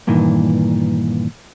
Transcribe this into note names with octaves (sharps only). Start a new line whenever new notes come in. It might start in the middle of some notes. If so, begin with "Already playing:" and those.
G2 A#2 D#3 E3